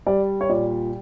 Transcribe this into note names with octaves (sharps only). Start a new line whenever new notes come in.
G3 D5
C#5
A#2 D5